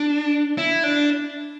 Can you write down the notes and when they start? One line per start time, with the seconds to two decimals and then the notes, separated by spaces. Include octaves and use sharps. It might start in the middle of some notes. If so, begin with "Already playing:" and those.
Already playing: D4
0.58 E4
0.84 D4